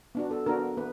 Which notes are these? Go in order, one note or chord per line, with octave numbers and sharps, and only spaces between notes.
B3 D4 F#4
A4
B3 D4 F#4 A#4
B3 B4